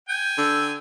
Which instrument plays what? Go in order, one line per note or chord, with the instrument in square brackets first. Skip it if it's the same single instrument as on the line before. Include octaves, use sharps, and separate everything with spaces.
[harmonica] G5 G#5 [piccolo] G6
[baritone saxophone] D3 [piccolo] E6